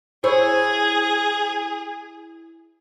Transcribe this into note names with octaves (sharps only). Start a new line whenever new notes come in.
E4 G#4 C5 C#5